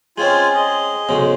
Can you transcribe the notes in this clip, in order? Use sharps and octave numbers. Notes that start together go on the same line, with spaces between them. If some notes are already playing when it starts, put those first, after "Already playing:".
G#3 C4 C#4 F4 G#5
G#4 D#5
B1 G#2 C#3